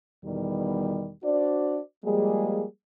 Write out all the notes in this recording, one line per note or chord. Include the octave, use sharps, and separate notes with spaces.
E2 B2 D#3 G3
D4 F#4 C5 D5
F3 G3 G#3 A#3 G#4